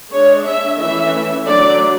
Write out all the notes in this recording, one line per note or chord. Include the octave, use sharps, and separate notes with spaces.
G#3 D4 C#5
E5
E3 A3 C#4 E5
D3 F#3 A3 D5